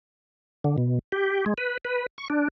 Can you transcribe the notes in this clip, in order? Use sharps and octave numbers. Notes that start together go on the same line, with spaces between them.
D3
B2
G4
G#3
B4
B4
C#6
D4